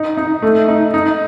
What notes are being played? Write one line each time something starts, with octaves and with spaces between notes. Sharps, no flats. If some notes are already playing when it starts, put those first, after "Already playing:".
Already playing: D#4
D#4
A3
D#4
D#4